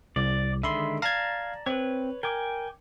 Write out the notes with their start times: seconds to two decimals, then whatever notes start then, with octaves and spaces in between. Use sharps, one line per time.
0.16 C2 D5
0.63 D3 D#3 G#3 E5 B5 C6
1.02 D5 F5 A5 A#5 G#6
1.66 C4 B4 C#5
2.23 A#4 G5 G#5 D6